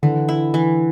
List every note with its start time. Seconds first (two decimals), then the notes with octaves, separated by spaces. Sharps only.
0.03 D3 E3
0.29 E4
0.54 E3